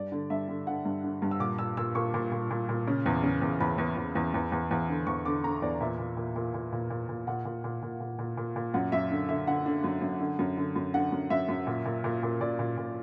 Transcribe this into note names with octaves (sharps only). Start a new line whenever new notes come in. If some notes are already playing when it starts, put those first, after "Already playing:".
Already playing: G2 D5
D3
G2 E5
D3
D3 F#5
G2
D3
G2
E6
A#2 D6
A#2 E6
A#2 E6
A#2 C#6
A#2
A#2
A#2
A#2
C#3
E2
C#3
E2
E2 B5
E2
E2
E2
E2
E2
E2
D3
E2 C#6
D3 D6
D3 A#5
E2 D5
A#2 E5
A#2
A#2
A#2
A#2
A#2
A#2
A#2
A#2 F#5
A#2
A#2
A#2
A#2
A#2
A#2
A#2
F#2 F#5
F#2 E5
D3
D3 E5
D3 F#5
D3
F#2
F#2
D3
F#2
D3
F#2
D3 F#5
F#2
F#2 E5
F#2
A#2
A#2
A#2
A#2
A#2 D5
A#2
A#2